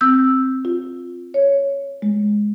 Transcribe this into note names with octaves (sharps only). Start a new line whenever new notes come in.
C4 E6 G6
F4
C#5
G#3